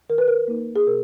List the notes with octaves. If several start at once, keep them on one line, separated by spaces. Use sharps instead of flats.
D#3 A#4
B4
A#4
A#3 D#4
G#4
B2 A#4